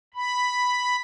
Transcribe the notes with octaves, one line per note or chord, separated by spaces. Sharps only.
B5